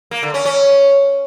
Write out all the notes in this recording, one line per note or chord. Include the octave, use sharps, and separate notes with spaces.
A#3
D3
C#4
C#4